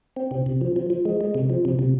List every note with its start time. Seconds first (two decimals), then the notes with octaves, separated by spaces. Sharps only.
0.16 C4
0.31 C3
0.46 C3
0.61 F3
0.76 F3
0.90 F3
1.05 G#3
1.21 G#3
1.35 C3
1.50 F3
1.65 C3
1.79 C3